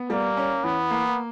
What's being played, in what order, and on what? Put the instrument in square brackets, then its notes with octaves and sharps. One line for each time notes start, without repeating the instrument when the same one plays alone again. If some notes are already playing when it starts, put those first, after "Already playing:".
Already playing: [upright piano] B3
[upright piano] G3 [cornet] A#3
[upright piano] C#4
[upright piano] E3 [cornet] B3
[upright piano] A#3